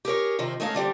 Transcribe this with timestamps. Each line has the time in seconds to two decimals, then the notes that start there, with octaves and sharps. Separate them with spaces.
0.05 G4 G#4 A#4 C#5
0.39 C3 D#3 F3 C5
0.60 G#3 A3 C#4 D#4 C#5 F5
0.74 D3 G3 C4 G4